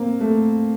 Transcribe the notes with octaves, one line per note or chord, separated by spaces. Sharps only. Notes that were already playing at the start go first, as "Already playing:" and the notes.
Already playing: A#3 C4
A3